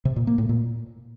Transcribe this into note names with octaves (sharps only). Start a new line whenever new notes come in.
C3
A#2
A#3
A2
A#2